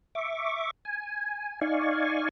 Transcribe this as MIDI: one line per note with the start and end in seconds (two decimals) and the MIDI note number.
0.15 0.71 76
0.15 0.71 85
0.15 0.71 86
0.85 1.60 80
1.61 2.29 63
1.61 2.29 74
1.61 2.29 77
1.61 2.29 80
1.61 2.29 85